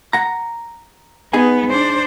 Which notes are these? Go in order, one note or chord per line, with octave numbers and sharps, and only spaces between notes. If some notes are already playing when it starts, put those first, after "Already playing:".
F#5 A#5
B3 D#4 G#4 G#5
D4 C5